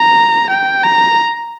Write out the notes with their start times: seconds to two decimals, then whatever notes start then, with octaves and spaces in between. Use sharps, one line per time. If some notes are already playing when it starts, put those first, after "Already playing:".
Already playing: A#5
0.50 G5
0.84 A#5